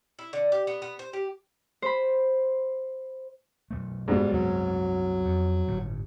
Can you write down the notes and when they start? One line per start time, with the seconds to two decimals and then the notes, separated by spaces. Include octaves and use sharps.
0.19 E4
0.33 D3
0.52 G4
0.67 B3
0.82 B3
0.99 C5
1.13 G4
1.82 C5 B5
3.71 B1 A3
4.08 G#2 B2 G3
4.32 C2 F#2 F#3
5.25 F2
5.68 G1 A2